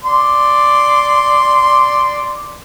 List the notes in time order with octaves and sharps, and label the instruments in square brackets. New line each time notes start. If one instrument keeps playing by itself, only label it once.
[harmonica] D5 C6